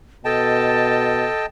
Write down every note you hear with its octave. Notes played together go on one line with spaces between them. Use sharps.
B2 A4 D#5 G5 A5